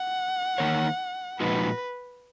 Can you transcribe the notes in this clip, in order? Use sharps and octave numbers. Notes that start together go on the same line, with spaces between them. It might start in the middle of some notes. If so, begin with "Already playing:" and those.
Already playing: F#5
D#3 A#3 D#4 A#4 C#5
A#2 F3 G#3 D#4 F#4 B4